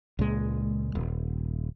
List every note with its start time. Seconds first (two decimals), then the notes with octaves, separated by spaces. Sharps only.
0.19 C#2 A#2 G#3
0.95 D#1